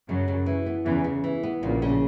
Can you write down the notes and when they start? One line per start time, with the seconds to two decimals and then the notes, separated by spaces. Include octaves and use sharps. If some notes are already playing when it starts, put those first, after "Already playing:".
0.09 F#2 C#3 F#3
0.28 C#3
0.46 E3
0.66 B3
0.85 E2 C#3 E3
1.04 C#3
1.24 E3
1.43 B3
1.62 A#1 A#2 C#3
1.82 C#3